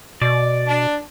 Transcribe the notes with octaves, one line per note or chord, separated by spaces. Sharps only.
B2 D5
D4